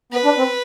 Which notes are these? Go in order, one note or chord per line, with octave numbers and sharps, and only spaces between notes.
B3 B4
D4
C4